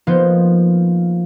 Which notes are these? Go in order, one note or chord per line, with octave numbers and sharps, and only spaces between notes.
F3 A#3 B3 D#4 F4 C5